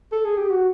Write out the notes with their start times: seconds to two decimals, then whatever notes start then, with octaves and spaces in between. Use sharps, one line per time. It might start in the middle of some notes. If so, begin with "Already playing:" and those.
0.12 A4
0.25 G#4
0.37 G4
0.50 F#4